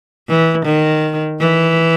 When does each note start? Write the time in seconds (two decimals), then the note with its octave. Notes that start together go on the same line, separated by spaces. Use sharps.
0.28 E3
0.65 D#3
1.40 E3